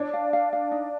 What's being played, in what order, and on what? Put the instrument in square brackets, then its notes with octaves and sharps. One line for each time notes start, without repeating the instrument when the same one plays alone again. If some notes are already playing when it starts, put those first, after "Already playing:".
Already playing: [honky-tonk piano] D4 [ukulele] C#5
[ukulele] F5
F5
F5
D#4